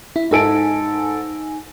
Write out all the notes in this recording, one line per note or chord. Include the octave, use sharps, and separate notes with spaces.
E4
G#2 D#4 A4 G#5 D7